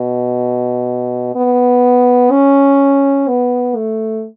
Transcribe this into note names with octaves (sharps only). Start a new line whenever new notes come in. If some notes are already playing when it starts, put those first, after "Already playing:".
Already playing: B2
B3
C#4
B3
A3